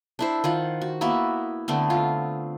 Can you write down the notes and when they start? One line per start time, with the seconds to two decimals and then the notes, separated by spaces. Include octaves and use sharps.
0.19 D4 E4 C5
0.44 D#3 F4 F#5
0.82 F#4
1.01 A#3 B3 E4 F#4
1.68 D3 A3 B3 C4
1.90 F4